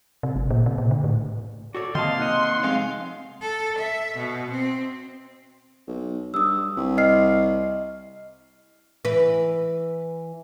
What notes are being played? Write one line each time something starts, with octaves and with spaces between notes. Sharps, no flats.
C3
G#1
A#2
C3
A#2
D3
A2
F#4 A4 C#5 D5
C3 D#3 A#3 D#5 F5 A5 C6
D#4 D#5 F#5
F2 C3 G#3 C4 F5
A4
E5
B2
C4
B1
G2 D#6 E6
C2
D#5 F6 C7
E3 B4